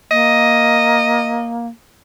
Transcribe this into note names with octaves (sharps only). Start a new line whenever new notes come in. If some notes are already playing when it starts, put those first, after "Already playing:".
A#3 D#5